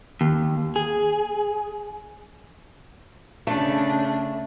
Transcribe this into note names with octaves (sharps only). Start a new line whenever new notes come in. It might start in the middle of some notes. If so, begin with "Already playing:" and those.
D#2
G#4
C#3 A3 D4